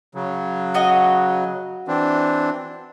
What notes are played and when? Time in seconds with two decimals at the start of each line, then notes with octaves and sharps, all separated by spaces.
0.15 C#3 F#3
0.74 F#4 D#5
1.88 E3 C4 D4